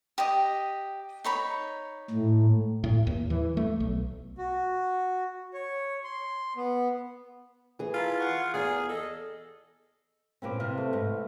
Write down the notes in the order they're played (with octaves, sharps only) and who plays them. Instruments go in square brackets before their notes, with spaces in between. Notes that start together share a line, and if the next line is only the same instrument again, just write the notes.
[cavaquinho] G4 D#5 D#6
D#4 C#5 B5
[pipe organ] A2
[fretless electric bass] A2
D#2
E3
A3
B1
[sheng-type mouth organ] F#4
C#5
C6
B3
[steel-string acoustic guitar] E3 G#4
[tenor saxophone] F4 [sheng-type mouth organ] A4 A#4 B5
[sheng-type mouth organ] F5 F#5 C#6
[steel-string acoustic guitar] E2 G#5 [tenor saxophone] G#4 [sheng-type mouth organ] A#4 F5
[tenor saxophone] A4 [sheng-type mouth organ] D#5
[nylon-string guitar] A#2 A#3 C#4 [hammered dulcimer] C4 B4 D6
[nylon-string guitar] C3 [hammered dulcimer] F5
[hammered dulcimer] A3
[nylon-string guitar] G#2